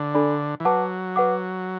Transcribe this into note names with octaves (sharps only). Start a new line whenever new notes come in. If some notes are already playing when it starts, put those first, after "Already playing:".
Already playing: D3
D4 A4 D5 B5
E3
F#3 B4 F#5 A5 D6
B4 F#5 D6